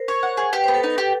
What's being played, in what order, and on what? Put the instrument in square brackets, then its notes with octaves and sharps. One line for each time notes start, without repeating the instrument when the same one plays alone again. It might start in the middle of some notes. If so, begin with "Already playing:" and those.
Already playing: [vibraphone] A#4 C5
[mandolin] C#5
F#5
G#4
[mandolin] G4 [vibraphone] B4
[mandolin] B3 [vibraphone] C5
[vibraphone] A4 B4
[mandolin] D#4
G4